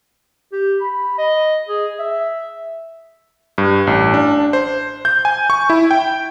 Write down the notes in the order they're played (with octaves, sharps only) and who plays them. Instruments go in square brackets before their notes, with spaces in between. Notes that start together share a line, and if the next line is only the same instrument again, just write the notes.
[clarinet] G4
B5
D#5
G#4
E5
[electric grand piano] G2
A1
D4
C5
G6
G#5
C#6
E4
G5